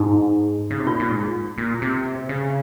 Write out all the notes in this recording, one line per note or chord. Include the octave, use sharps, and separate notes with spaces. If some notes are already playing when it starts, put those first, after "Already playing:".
Already playing: G#2 D#4
C#3
C3
A#2 F4
A#2
G#2
A#2
C3
C#3